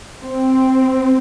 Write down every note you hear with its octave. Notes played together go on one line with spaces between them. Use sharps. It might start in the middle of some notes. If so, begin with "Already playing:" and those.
C4